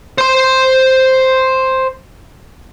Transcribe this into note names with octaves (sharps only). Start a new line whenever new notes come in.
C5 C6